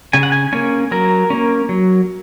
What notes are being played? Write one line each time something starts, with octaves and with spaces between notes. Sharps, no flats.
C#3 G#5
F#5
G#5
A#3 C#4 G#5
F#3 A#4
A#3 C#4
F#3